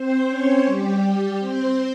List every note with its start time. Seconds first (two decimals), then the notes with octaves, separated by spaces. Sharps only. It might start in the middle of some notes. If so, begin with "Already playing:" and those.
Already playing: C4 C5
0.29 C#4 C#5
0.65 G3 G4
1.39 C4 C5